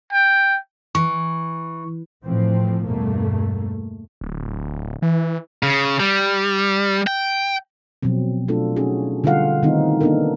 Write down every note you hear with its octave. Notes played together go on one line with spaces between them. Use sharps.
G5
E3 C#6
A2 E3 F3 A3 C4
E2 G2 B2 A3 A#3
D1
E3
C#3
G3
G5
B2 F3 F#3 C4
A3 D4 F4 A4
C#4 D#4 F#4 G#4
D3 G3 F4 A4 F5 F#5
D#3 A3 B3 C4 D#4 E4
A#3 B3 D4 D#4 A4 A#4